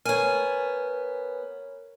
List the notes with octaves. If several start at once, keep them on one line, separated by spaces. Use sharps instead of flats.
B3 A#4 C#5 G#5